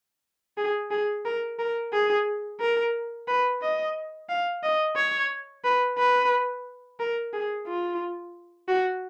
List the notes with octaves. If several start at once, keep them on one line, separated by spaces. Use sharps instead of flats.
G#4
G#4
A#4
A#4
G#4
A#4
B4
D#5
F5
D#5
C#5
B4
B4
A#4
G#4
F4
F#4